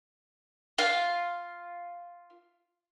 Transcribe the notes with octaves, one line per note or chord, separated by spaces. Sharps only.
F4 F5